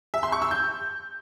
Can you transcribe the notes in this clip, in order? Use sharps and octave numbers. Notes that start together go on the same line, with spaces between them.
E5
C6
C#6
E6
G6